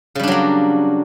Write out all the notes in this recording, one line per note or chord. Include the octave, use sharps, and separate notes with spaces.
C#3 F#3 G3 A#3 D4